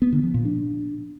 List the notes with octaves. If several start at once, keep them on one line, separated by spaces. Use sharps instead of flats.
B3
D3
F3
A#2
D4